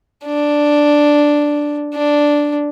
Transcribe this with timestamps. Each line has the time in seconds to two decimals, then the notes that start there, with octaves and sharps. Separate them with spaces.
0.27 D4
1.94 D4